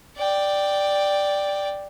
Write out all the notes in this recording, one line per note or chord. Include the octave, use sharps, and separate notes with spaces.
D5 G5